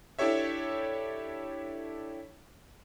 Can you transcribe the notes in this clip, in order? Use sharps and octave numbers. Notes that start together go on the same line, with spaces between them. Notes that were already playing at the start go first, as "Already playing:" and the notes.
D4 E4 G4 A4 C#5 E5